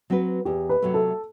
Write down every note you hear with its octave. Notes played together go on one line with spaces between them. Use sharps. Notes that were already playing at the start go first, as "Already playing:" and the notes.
F#3 C4 F#4 B4
E2 G4
B4
C3 F#3 A3
A4